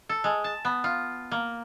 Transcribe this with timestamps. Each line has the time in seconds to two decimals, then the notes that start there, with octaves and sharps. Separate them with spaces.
0.09 A4
0.24 G#3
0.44 A5
0.65 B3
0.84 F4
1.32 A#3